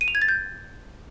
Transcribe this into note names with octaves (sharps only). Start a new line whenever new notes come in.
D#7
F7
G#6
A6
G6